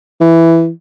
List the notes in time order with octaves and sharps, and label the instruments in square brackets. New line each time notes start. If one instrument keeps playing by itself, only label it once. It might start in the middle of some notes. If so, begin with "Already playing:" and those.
[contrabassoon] E3